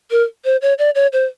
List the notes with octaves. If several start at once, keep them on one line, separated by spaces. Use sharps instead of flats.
A#4
C5
C#5
D5
C#5
C5